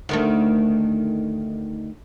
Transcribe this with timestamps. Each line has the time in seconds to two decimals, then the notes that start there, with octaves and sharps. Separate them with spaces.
0.09 D2 D#3 A3